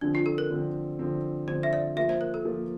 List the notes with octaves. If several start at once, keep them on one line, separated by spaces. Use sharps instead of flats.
D3 F3 C4 D4
F4
A4
A#4
D3 F3 C4
D3 F3 C4
D3 F3 C4 C5
E5
D5
F3 A#3 F4 E5
C5
A#4
A4
F3 A#3 F4